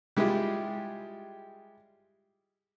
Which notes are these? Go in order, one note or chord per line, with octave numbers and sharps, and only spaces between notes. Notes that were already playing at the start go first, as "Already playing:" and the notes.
G3 G#3 E4 F4 G4